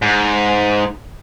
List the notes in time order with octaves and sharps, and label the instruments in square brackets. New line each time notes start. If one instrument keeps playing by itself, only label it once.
[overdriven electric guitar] G#2